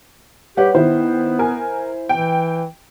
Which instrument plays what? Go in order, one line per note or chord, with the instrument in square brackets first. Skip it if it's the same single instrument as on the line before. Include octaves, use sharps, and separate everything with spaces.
[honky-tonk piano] G3 [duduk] G4 [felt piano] B4 C#5 F#5
[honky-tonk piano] D#3 [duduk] B3 [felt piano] E4 C5
[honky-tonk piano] A#4 G#5
[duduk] E3 [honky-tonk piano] G5